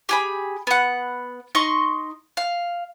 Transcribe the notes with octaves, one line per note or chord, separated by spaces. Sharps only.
G4 G#4 B5
B3 F#5
D#4 D#5 C6 C#6
F5